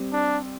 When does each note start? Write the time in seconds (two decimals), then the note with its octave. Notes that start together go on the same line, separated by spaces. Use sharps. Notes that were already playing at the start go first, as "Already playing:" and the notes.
Already playing: G3 C4
0.12 D4